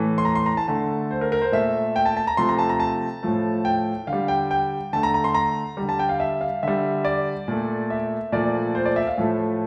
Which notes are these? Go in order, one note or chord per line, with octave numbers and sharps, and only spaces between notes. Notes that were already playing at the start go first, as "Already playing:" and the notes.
Already playing: A2 E3 A3
C6
A#5
C6
A#5
A5
D3 A3 A5
C5
A#4
A#4
C5
A#2 A3 E5
G5
A5
A5
A#5
C3 F3 A3 C6
A#5
A5
A#5
A5
A2 F3 A3
G5
D3 F5
G3
G5
G5
D3 A3 A5
A#5
A#5
C6
A#5
D3 G3
A5
G5
F5
E5
F5
D3 G3 E5
D5
A#2 A3
E5
A#2 F3 A3 D5
C5
D5
E5
F5
A2 F3 A3